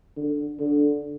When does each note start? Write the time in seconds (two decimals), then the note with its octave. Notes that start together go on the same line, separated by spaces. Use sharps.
0.17 D3
0.59 D3